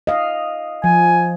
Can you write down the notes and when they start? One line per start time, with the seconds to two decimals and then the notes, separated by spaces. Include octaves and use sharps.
0.07 D#5 F5
0.84 F3 G#5